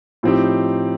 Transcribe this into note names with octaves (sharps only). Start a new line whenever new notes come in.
A2 F3 C4 D#4 G4